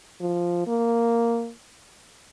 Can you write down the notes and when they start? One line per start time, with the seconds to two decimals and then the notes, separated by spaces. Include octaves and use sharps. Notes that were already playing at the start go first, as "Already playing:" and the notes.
0.20 F3
0.67 A#3